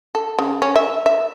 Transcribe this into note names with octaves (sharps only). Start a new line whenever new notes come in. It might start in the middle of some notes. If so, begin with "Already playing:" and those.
A4
C#3
C#4
E5
E5